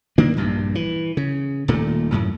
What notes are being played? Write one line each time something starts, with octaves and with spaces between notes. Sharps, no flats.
D#3 A#3 D4
A#1 G2 A#2
E3
C#3
D#1 A#2 D#3 A3
F#2 A2